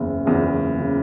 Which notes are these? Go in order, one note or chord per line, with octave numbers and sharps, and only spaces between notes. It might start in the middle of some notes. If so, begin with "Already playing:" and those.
Already playing: F#1 E2 C#3
F#1 E2 C#3
C#3